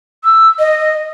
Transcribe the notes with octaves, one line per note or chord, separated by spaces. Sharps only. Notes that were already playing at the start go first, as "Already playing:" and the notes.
E6
D#5